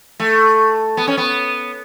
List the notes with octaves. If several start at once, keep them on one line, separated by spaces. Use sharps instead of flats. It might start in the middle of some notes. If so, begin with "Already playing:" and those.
A3
B3
C#4
B3